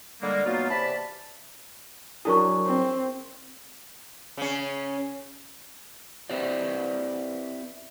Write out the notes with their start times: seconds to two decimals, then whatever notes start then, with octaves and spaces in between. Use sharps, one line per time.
0.22 D3 G3 G#3 A#3
0.45 B2 F#3 A#3 B3 D#4 F4
0.70 C3 E3 D5 A5 B5
2.25 F#3 D4 E4 G#4 A#4 C#6
2.66 C4
4.37 C#3 C#4
6.29 C4 E4 G4 B4 C5 D5